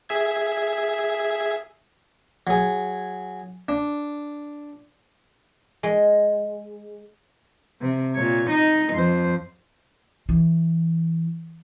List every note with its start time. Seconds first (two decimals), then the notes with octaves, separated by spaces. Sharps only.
0.09 G#4 E5 G#6
2.47 F#3 G#4
3.69 D4
5.83 G#3
7.81 C3
8.15 A#2 C#5
8.50 D#4 D#5
8.93 F2 C5
10.29 E3